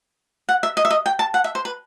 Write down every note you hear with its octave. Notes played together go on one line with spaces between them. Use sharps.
F#5
E5
D#5
E5
D#5
G5
A5
F#5
E5
C5
B4